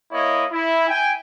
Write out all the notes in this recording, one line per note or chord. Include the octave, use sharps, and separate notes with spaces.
A#3 E4 C#5 D#5
E4
G5 G#5